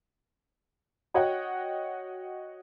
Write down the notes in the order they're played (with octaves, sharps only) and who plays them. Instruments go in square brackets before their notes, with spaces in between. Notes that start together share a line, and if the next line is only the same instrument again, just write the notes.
[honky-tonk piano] F#4 C#5 D#5 F#5 G5